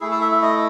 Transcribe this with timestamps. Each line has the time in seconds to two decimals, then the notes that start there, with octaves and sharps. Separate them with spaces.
0.01 A3 E4 G#4
0.12 A4
0.21 E5
0.32 E5
0.42 D#5